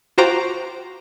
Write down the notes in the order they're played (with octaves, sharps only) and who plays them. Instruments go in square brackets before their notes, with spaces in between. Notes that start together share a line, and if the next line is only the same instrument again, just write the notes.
[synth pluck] F4 F#4 C5 G5 A#5 D6